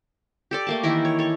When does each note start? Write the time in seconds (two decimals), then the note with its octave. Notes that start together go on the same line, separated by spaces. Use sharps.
0.51 G4 A4 D5
0.67 A3 A#3 A5
0.83 D#3 E3 E4 A#4
1.05 C#5
1.19 A4 C#5